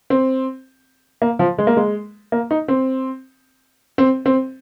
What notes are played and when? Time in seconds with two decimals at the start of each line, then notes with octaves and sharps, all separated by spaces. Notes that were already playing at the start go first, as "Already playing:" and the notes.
0.10 C4
1.22 A#3
1.39 F3
1.58 G#3
1.67 A#3
1.77 G#3
2.32 A#3
2.51 D#4
2.68 C4
3.98 C4
4.26 C4